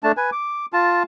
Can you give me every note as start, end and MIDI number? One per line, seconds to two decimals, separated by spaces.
0.03 0.12 57
0.03 0.12 62
0.03 0.12 81
0.17 0.30 71
0.17 0.30 80
0.32 0.66 86
0.73 1.03 65
0.73 1.03 81